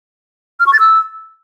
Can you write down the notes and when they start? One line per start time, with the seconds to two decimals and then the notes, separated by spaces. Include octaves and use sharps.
0.60 F6
0.67 C#6
0.73 A6
0.80 E6